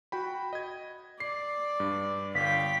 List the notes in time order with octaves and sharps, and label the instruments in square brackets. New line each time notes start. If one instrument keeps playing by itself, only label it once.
[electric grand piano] F#4 G5 B5
D#5 G#6
[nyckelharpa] D5 [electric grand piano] C7
[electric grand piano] G2
[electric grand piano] G1 [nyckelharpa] F5 G5 [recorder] B6